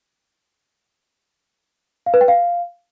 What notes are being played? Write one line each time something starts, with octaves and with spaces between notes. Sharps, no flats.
F5
B4
G5
F5